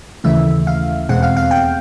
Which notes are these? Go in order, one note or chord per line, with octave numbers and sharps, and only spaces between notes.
D#2 C#3 E3 A3 E5
F5
E2 B2 G#3 C4 F#5
F5
F5
G5